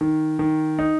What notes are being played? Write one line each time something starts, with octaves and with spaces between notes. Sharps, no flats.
D#3
D#3
D#4